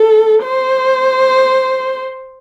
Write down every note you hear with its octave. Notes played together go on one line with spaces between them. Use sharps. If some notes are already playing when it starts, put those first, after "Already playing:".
Already playing: A4
C5